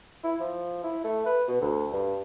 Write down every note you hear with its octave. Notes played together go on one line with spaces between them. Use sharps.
E4
F3
E4
A3
B4
B2
D2
G2